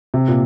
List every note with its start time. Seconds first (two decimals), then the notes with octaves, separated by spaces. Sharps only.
0.14 C3
0.28 A#2